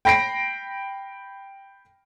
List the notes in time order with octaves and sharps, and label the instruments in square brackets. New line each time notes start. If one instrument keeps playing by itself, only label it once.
[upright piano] G5 B5 A#6 C7 D7